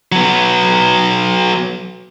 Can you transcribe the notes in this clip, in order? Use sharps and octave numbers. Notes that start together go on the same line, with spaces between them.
F#3 B3